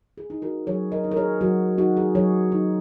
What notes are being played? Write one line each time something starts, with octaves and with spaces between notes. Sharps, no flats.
G#4
D#4
F#4 A#4
F#3 G#4 C#5
A#4 D#5
D#4
A#4
G#4 C#5
F#3 F#4 A#4
D#4 F#4
G#4
F#3 G#4 C#5
D#4